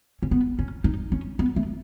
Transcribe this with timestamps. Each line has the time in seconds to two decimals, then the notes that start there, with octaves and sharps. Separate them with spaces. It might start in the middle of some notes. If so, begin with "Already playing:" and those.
0.23 C#4
0.31 B3
0.59 C#4
0.84 D#4
1.12 C#4
1.39 B3
1.56 A3